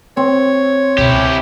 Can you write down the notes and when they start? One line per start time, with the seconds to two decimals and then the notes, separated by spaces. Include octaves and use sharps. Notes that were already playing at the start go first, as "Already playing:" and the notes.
0.17 C4 C#5
0.98 C#2 B2 E4 G4